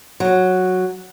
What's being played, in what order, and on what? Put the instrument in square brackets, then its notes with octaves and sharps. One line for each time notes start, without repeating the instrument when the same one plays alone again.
[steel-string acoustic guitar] F#3